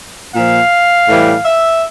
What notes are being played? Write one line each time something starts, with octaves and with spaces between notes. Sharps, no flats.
A#2 F3 F5
A2 E3 G3
E5